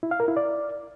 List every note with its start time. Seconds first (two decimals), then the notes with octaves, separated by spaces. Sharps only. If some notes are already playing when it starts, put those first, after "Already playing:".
0.03 E4
0.11 F5
0.20 A#4
0.28 E4
0.36 D5